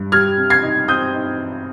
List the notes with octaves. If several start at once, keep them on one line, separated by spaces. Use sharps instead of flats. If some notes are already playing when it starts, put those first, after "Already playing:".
Already playing: G2
G3 F6 G#6
C3
G#6 C7
D#4
C4 D#6 G6
D#4